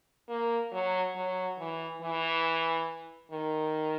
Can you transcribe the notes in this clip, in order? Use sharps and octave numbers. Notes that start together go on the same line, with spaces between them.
A#3
F#3
F#3
E3
E3
D#3